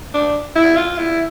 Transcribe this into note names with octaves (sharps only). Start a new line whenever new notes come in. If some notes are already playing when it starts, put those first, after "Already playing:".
D4
E4
F4
E4